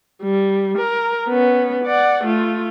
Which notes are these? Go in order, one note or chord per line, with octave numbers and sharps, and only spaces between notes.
G3
A#4
B3 C#4
D5 F#5
A3 F4